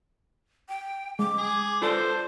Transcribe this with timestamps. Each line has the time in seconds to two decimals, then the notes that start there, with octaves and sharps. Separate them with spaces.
0.69 G5
1.19 G#3 D6
1.38 G#4
1.82 F4 A4 C5 D5 A5